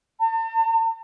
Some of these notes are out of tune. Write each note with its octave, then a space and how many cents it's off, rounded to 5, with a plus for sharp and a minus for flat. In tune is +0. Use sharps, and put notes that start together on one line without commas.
A5 +45